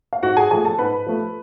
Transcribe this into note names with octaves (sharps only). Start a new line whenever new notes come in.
F5
G#2 F#4 F#5
G#4 G#5
F3 A3 G#4 G#5
A4 A5
G#2 B4 B5
F3 A3